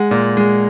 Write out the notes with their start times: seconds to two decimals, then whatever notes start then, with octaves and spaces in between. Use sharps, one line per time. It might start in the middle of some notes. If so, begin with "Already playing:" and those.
Already playing: G#3 F#5
0.11 A#2
0.37 G#3